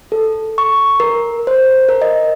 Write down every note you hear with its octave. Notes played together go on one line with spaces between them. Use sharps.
A4
C#6
A#4
C5
A#4
D#5